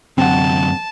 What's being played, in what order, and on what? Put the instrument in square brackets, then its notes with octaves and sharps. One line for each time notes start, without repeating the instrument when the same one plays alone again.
[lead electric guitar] F#2 D3 [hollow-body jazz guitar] C4 F#5 [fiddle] A5